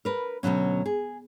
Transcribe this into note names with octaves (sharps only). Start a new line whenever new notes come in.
A#4 B4
D2 G#2 B2 F#3 C#4
G#4